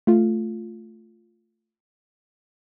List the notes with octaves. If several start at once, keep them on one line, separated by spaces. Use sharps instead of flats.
A3 F4